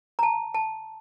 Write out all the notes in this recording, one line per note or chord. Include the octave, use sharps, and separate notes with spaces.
A#5
A5
A5